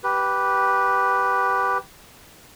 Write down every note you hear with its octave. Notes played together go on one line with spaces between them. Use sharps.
G4 B4